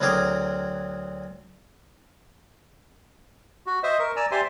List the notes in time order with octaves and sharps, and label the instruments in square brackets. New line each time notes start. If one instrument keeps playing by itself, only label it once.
[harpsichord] D2 F#3 C4 G#4 A#4 D6
[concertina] F#4
C5 D#5 E5
A#4 C#6
D5 G#5 A#5 E6
G4 C5 D5 E5 G#5 C6